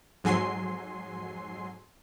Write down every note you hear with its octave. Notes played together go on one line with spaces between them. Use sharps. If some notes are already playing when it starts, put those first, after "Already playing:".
F2 G#2 F#3 G#5 C6 C7